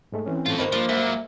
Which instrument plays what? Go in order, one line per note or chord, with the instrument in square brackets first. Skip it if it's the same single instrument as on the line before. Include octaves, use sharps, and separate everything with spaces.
[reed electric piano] G#2 G#3 A3
[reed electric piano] E3 C#4 [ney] C4
[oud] A2 [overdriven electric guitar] F4 A4
[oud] D#3 A#3 D#4 [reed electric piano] A#4 C5 B5
[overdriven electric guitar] F3 [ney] A#3 [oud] D4
[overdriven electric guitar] G#2 F#3 [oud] E5